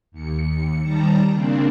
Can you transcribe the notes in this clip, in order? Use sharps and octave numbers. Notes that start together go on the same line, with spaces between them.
D#2 C#7
D#3 G3 A5 A#5
C#3 A#3 C4 D4